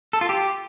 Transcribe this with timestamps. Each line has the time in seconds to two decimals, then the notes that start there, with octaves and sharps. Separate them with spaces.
0.13 A4
0.21 F4
0.29 G4